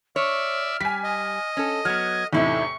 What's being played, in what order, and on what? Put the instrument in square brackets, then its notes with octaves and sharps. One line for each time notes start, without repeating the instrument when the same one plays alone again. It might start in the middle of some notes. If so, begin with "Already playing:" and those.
[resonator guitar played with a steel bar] C#5 [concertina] D5 E5 [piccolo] F6
[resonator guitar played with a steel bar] G3 [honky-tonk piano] G#5 B6
[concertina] D#5
[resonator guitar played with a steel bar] C#4 A4
[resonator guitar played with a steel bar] F#3 B3 [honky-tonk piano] F6 [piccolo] G#6
[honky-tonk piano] E2 A2 C3 [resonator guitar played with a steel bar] D#4 E4 [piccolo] C#6